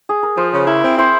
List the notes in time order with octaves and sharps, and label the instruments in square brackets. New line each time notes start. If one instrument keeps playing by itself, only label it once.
[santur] G#4
A#4
[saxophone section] F3 [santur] C5
[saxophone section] C#3
[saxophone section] E4 [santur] A#4
[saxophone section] C4
[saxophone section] E4 [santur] C5